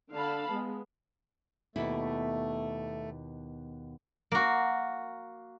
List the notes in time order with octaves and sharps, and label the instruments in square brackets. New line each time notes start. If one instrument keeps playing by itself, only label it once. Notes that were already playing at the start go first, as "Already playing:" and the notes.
[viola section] D3 D4 F5 A5 B5
G#3 B3
[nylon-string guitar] D#2 B2 E4 [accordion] A3
[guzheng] A#3 F#4